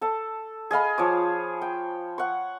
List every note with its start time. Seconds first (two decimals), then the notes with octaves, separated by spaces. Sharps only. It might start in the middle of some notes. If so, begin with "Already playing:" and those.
0.01 A4 A5
0.71 G#4 D#5 F5 B5
0.98 F3 C#5 D6
1.62 G5
2.18 F#5 C#6